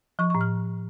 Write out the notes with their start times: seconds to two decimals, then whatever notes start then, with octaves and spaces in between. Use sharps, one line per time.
0.19 F3 C#6
0.30 A2 C#6
0.41 F6